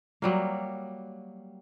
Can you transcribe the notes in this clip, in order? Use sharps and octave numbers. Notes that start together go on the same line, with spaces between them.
F#3 G3 A#3